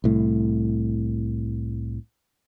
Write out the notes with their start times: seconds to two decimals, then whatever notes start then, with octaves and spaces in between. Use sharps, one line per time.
0.04 C2 A2